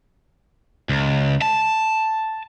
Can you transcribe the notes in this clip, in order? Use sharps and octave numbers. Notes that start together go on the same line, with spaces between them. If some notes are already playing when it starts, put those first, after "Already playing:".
C#2
A5